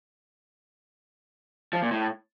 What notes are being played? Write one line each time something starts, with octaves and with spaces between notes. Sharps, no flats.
F3
A#2
A2